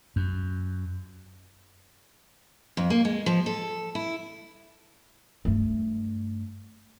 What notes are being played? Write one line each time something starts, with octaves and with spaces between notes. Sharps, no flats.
F#2
F2
A#3
G#3
F3
A4
E4
G2 A3